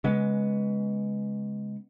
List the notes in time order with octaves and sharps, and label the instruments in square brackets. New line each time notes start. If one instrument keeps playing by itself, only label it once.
[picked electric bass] C#3 G#3 B3